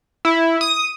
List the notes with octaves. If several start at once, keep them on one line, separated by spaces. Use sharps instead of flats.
E4
D#6